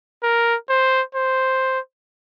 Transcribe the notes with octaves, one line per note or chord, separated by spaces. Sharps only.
A#4
C5
C5